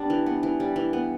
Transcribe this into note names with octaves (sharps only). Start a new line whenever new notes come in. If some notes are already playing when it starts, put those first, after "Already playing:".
Already playing: G3 B3 D4
E3
B3
E3
G3
E3
B3